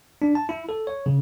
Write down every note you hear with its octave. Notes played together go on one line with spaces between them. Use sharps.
D4
A5
E4
A4
C#5
C#3